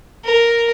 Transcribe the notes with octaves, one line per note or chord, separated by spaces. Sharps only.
A#4